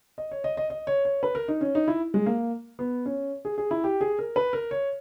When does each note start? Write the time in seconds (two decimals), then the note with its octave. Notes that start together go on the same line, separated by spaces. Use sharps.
0.18 D#5
0.31 C#5
0.44 D#5
0.57 D#5
0.70 D#5
0.87 C#5
1.05 C#5
1.23 B4
1.35 A#4
1.48 D#4
1.61 C#4
1.75 D#4
1.88 E4
2.14 G#3
2.26 A#3
2.79 B3
3.06 C#4
3.45 G#4
3.58 G#4
3.71 E4
3.84 G4
4.01 G#4
4.19 A#4
4.36 B4
4.53 A#4
4.71 C#5